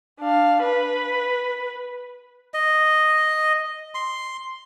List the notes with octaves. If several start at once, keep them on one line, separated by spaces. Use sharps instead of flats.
D4 F5
B4
D#5
C6